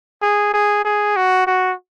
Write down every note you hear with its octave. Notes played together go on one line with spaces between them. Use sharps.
G#4
G#4
G#4
F#4
F#4